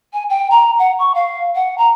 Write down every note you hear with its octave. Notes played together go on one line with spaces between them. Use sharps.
G#5
G5
A#5
F#5
C#6
F5
F#5
A#5